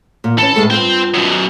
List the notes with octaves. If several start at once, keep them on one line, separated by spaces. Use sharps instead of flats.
A#2
E3 C#4 A4
A2 G#3 A3
G2 F4 C5 G5
F#2 B2